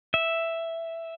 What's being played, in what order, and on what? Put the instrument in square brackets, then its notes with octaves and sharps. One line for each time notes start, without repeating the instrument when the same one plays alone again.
[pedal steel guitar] E5